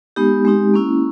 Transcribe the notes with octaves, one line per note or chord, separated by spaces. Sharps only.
G#3 B3 D#4 G4
G#3 C4 D#4 G4
A#3 C#4 E4